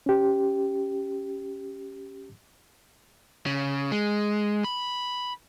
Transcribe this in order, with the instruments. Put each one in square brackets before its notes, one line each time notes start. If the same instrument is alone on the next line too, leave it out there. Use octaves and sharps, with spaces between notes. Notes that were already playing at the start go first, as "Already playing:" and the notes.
[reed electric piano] C#4 G4
[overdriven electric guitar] C#3
G#3
B5